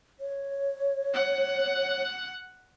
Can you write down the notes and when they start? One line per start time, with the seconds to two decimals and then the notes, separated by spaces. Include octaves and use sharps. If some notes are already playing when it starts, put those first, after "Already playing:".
0.20 C#5
1.14 F#5